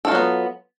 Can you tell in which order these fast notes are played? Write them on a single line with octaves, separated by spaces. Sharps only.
A4 F4 F#3 B3